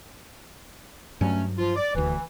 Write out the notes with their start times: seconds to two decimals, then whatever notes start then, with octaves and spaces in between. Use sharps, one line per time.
1.21 G2 F#3 A3 C#4
1.58 F3 F4
1.76 D5
1.94 D#1 D2 E3